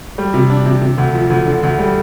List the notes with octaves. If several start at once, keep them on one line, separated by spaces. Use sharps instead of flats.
G3
C3
D4
C3
C3
D2
F3
D2
D3
D2
G3